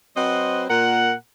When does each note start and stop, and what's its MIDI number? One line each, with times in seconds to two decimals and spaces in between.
0.16 0.65 54
0.16 0.65 60
0.16 0.65 71
0.16 0.65 72
0.16 0.65 75
0.16 0.65 78
0.70 1.13 46
0.70 1.13 70
0.70 1.13 78